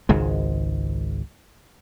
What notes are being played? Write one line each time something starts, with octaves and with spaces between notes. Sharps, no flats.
G#1 C#2 G#2 G#3